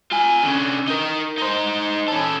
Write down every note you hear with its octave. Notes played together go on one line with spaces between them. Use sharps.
F4 G#5
D3 C#4
D#4 A#4
D#4 C5
C#4 A4